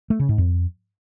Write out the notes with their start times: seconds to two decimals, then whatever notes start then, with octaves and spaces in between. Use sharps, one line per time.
0.10 A3
0.19 C#3
0.29 G#2
0.38 F2